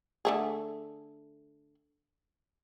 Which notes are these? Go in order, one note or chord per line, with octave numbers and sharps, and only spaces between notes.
D3 A3 G#4